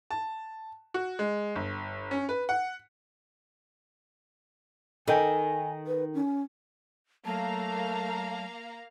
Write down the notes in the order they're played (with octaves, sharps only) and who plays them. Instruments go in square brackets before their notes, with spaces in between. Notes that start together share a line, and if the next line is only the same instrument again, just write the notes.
[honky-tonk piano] A5
F#4
G#3
G1
C#4
B4
F#5
[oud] D#3 [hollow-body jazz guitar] A4 D#5 G5 [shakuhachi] G#5
[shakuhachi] B4
C#4
[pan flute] F#3 [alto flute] A3 [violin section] A#3 F5 A#5 [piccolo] A5